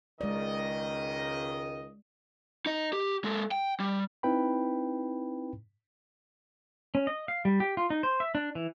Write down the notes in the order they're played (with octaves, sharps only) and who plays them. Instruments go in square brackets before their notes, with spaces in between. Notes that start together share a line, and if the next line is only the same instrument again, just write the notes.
[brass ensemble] C#2 D#3 D#5 [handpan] G#3 D5
[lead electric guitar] D#4 D#5
G4
G#3 A4
G5
G3
[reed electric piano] C4 D#4 E4 B4 G5 B5
[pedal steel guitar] C#4
D#5
F5
G3
G4
F4
D#4
C5
E5
D4
E3